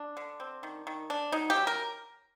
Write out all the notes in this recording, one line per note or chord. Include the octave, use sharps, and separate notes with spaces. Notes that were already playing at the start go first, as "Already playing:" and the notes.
Already playing: D4
D3
C4
D#3
D#3
D4
F#3 D#4
G4
F#3
A#4